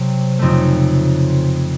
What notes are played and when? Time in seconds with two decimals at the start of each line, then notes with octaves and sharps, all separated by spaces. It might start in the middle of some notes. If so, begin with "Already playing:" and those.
Already playing: C3 F#3 C4
0.39 F2 C#3 A3 C4 D#4